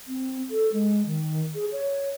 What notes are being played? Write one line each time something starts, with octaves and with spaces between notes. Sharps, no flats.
C4
A4
G#3
D#3
G#4
C#5